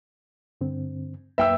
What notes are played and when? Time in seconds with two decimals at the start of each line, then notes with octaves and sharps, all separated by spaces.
0.61 G2 D3 C4
1.38 F#2 A#3 B4 E5 G5 E6